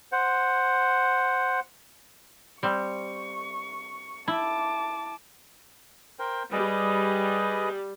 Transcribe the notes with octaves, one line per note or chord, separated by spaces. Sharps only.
C5 F#5
G3 C4 C#6
E4 A5 D6
A#4 C5 G5
G3 G#4 B4 D#5